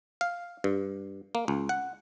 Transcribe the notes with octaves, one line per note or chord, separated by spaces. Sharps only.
F5
G2
A#3
C#2
F#5